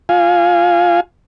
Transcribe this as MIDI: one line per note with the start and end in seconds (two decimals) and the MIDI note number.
0.09 1.00 65
0.09 1.00 77
0.09 1.00 80